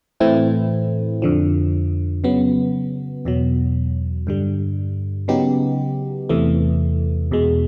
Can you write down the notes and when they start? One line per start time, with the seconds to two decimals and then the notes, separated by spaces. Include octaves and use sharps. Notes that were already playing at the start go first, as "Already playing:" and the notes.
0.20 A2 E3 A3 C4 E4
1.22 F2 D3 F3
2.24 C#3 F#3 B3
3.25 E2 B2 F#3
4.27 G2 D3 G3
5.28 C#3 F#3 B3 D#4 G4
6.29 E2 C3 E3 A3
7.31 E2 B2 G#3